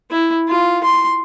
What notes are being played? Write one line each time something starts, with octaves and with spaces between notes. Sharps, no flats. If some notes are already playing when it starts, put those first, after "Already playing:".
E4
F4
C6